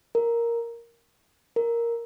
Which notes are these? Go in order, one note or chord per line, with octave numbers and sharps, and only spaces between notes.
A#4
A#4